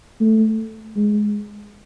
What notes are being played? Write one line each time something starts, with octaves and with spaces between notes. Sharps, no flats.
A3
G#3